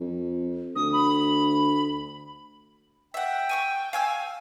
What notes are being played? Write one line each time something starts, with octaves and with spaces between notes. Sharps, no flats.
F2
D2 D#6
B5
E5 F#5 G5
G#5 C#6 E6
F5 G#5 E6